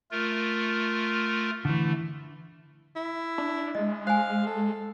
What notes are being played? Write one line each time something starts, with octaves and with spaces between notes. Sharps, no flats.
A3 F4 A#4
D3 E3 A3
E4
D4
G#3 D#5
C5 F5 G#5
A4